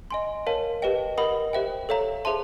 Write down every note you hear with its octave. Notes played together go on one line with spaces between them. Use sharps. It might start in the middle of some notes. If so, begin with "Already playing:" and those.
D#5 G#5 C6
A#4 C#5 F5 A5
G4 B4 D#5 G5
A#4 D#5 F#5 B5 D#6
G4 C5 E5 G5
A4 C#5 F5 A#5
G#4 C5 E5 A5 C6